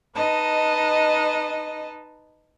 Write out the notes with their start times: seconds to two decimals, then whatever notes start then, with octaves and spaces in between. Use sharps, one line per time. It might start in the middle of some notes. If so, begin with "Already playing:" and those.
0.15 D#4 B4 D#5 A5